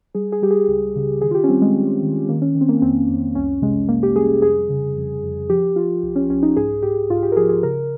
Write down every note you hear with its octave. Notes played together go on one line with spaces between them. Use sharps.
G3 G#4
G#4
G3 G4
G#4
C#2
C#3
D#3 G#4
F4
G4
C#4
G3 C4
G#3
G3
D#3
D#3 A#3
C#4
D#3
C4
A#3
F2 C4
F2
C2 C#4
C3 G#3
C3 A#3
G4
G3 G#4
F2 G#4
C#3
F2
F2
F3 G4
F3 F4
C2
C#4
C2 C#4
D#4
G#2 G#4
G#2 G4
G#2 F4
G4
A#4
F3 G#4
G#4
C#3 A#4